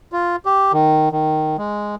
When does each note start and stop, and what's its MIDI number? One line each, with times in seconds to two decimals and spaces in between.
0.12 0.36 65
0.46 0.72 67
0.73 1.09 51
1.12 1.57 51
1.58 1.95 56